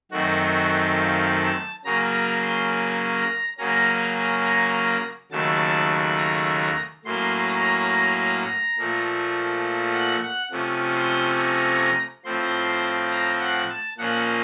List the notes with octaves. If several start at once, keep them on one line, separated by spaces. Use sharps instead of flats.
F#2 D#3 A3 C4 F#4
F5
A5
C#3 F#3 A#3 C#4 A#5
A#5
C6
A#5
C#3 F#3 A#3 C#4 A#5
A#5
A#5
D#2 C#3 F#3 A3 A5
A#5
A2 F#3 A#3 C#4 C6
A#5
A#2 F3 A3
F#5
F#5
C3 F3 A3 C#4
C6
A#5
A2 F3 C4 C6
A#5
F#5
A5
A#2 F3 A#3 C#4 F#5